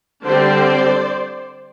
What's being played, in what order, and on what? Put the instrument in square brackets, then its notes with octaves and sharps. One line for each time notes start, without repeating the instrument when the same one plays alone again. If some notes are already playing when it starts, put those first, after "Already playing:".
[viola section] D3 G3 C4 C5 D5